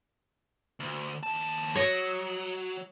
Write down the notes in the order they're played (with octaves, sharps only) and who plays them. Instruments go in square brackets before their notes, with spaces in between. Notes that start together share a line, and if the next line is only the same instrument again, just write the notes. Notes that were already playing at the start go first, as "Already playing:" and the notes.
[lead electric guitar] D2
D#2 A5
[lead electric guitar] F#3 [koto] C#5 D#5